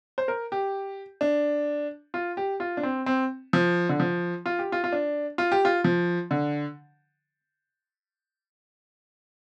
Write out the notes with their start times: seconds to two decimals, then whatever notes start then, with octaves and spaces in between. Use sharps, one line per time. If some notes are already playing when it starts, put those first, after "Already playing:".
0.18 C5
0.28 A#4
0.52 G4
1.21 D4
2.14 F4
2.37 G4
2.60 F4
2.77 D4
2.83 C4
3.06 C4
3.53 F3
3.89 D3
4.00 F3
4.46 F4
4.59 G4
4.72 F4
4.84 F4
4.92 D4
5.38 F4
5.52 G4
5.65 F4
5.84 F3
6.31 D3